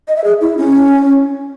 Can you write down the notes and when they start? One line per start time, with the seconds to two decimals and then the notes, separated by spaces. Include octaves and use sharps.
0.08 D#5
0.16 E5
0.24 G#4
0.41 E4
0.57 C#4